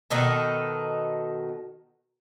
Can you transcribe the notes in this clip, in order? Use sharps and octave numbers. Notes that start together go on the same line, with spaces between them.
B2 D#3 D#4 A4